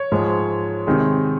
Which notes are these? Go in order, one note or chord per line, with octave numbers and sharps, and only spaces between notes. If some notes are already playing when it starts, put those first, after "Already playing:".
Already playing: C#5
G#2 F3 G#3
C3 D#3 G#3